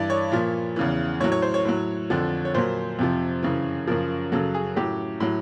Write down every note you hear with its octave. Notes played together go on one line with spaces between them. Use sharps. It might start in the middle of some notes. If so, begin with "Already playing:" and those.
Already playing: G2 E3 D5
C#5
A#2 F3
E2 C#3 E3
A2 F#3 C#5
C#5
C5
C#5
A2 F#3
F2 D3 F3
C#5
A#2 F#3 C5
F2 C3 F3
F#2 C#3 E3
F#2 C#3 F3 A#4
F#2 C#3 F#3 A4
G#4
A2 F#3 G4
A2 F#3